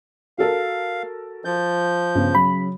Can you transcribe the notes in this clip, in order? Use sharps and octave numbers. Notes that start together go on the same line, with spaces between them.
F#4 A4 A#4 F5
F3 G6 A6
G2 C#3 B3
F#3 B5